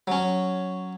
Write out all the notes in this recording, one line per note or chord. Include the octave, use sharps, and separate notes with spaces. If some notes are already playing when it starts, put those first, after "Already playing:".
F#3 C#4